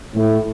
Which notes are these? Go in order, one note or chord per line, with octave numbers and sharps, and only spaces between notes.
A2